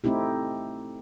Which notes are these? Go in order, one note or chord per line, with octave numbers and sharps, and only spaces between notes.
A3 C4 D#4 E4 G4